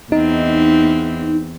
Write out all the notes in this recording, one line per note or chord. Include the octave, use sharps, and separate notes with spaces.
E2 C4 D#4